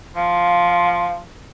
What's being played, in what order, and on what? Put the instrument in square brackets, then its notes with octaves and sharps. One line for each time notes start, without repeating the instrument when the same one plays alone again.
[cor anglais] F3 [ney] F5